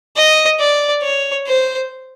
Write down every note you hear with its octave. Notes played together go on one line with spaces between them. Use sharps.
D#5
D5
C#5
C5